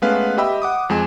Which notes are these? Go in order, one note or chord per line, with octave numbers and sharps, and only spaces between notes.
G#3 A3 B3 C#4 B4 F5
G4 D#5 E5 G5 B5 E6
F#5 D6 D#6
F2 G#3 G#5 E7